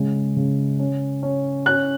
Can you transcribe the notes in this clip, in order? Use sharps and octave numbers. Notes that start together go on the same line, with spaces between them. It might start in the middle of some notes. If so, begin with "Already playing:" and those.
Already playing: C#3 G#3
C#3
C#4
C#4
C#4 F#6